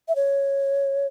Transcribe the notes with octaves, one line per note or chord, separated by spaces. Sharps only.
E5
C#5